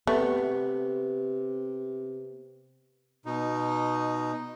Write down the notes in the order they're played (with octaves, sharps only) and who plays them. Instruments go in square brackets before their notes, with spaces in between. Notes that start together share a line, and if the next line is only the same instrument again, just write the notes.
[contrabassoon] C3 [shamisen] A3 [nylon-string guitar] B3
[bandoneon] B2 D#4